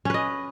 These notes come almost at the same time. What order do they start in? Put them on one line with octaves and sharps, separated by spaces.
C#4 B4 D#5